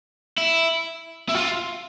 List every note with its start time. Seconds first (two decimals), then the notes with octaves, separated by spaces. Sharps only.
0.38 E4
1.29 E4
1.34 F4